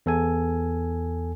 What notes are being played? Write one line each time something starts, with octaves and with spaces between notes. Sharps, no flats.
E2 A4 G#5